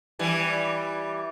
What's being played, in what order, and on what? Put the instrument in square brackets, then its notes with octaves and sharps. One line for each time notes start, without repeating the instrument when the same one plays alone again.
[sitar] E3 G3